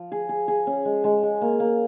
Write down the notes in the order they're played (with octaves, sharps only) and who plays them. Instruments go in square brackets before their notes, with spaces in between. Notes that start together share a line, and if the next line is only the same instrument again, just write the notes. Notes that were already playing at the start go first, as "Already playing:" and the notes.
Already playing: [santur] F3
G#4
G#4
G#4
C#4
G#3
G#3
G#3
A#3
A#3